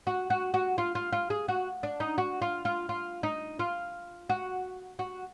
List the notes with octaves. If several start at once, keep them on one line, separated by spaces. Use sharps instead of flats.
F#4
F#4
F#4
F4
F4
F4
G#4
F#4
D4
D#4
F#4
F4
F4
F4
D#4
F4
F#4
F#4